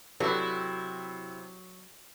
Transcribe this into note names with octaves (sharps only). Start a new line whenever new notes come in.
C3 F#3 E4 G4 A4 B4